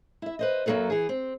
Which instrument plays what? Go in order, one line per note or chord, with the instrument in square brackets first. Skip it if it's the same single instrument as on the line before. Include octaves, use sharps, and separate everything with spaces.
[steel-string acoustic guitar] E4 E5
B4 C5 D#5
F#2 F#3 A#3 G#4 A4 B4
E3 G#4
C4